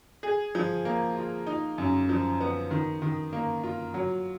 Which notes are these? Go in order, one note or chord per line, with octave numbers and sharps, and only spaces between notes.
G#4
F3
A#3
F4
D#4
F#2
F3
B3
D#3
D#3
A#3
F4
F#3